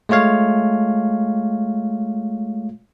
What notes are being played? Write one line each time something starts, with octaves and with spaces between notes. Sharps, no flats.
G#3 A3 F4 C#5 F5